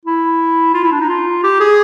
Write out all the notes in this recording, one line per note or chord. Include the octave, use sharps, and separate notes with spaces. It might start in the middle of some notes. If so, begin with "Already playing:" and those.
E4
F4
E4
D4
D#4
F4
G4
G#4